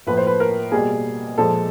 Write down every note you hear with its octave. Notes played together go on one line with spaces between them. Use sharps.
A2 F3 A#3 B4
C5
B4
A#4
B2 G3 A#3 G#4
A#2 F3 G#3 A4